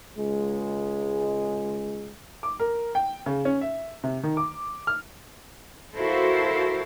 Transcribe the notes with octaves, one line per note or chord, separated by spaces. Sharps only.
C#2 G#3
D6
A#4
G5
C#3
C#4
E5
C3
D#3
D6
F6
E4 F#4 A4 A#4 C5 F5